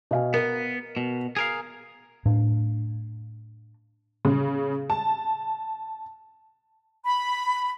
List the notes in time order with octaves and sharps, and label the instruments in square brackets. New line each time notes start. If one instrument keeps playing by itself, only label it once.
[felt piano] B2 F5 G#5
[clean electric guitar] B3 [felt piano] A#4
[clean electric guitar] B2
G#4 A#4 F5
[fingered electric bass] A2 D4
[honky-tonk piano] C#3
A5
[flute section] B5